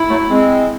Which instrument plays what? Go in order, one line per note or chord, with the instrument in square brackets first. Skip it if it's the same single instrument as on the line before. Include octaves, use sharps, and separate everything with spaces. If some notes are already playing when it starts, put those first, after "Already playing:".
Already playing: [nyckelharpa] E4
[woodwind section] F#3 A3
G#3 C4